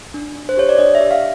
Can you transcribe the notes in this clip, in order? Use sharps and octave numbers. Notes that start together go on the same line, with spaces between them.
D4
D4
C5
G4 C#5
D5
D4 D#5
E5
G4
F5